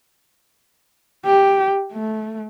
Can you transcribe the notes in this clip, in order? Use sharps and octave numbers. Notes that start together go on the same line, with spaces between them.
G4
A3